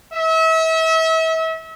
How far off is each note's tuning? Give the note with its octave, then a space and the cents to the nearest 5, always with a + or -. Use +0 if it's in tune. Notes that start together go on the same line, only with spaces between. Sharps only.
E5 -35